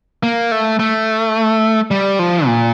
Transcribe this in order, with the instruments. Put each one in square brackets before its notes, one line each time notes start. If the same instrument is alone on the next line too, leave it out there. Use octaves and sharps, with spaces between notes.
[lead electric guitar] A#3
A3
A3
G3
F3
A#2